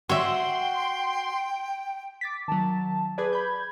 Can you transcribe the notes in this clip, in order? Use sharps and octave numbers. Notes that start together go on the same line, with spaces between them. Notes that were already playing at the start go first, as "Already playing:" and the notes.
F#4 C#5 E5 G5 C6
D6 A6 B6
D#3 F#3 A5
G#4 B4 D5 G#6
B5 G6